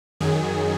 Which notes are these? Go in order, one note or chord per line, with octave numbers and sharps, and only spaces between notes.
F#2 D#3 F#3 G#4